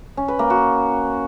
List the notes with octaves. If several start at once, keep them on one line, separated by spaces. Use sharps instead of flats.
C#4
B4
A#3
F#4